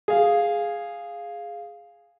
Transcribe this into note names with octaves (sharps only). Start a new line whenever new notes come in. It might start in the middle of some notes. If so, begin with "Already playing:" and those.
G#4 F5